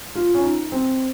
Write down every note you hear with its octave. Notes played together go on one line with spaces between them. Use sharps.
F4
C#4
D#4
C4